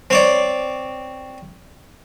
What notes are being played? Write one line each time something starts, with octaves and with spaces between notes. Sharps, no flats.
C4 C#5 D5